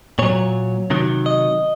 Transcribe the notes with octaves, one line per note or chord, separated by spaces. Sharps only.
A#2 F#3 C#5
C3 D#3 F#3
D#5